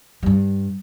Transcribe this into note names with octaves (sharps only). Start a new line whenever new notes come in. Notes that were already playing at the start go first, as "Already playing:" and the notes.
G2 G3